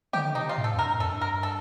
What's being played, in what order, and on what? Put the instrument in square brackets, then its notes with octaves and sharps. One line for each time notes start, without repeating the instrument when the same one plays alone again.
[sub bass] D3 [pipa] G4
[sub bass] C3 [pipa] D#4
[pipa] F4
[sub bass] A2
[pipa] A4
[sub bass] F2
[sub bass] G2 [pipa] A#4
[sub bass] A2
[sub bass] F2 [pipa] A4
[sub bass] G2
[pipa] A#4
A4